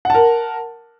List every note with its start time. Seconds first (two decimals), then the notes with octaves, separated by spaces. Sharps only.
0.05 F#5
0.10 A5
0.15 A#4